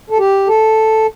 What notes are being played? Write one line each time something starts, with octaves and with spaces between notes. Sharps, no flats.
A4
G4
A4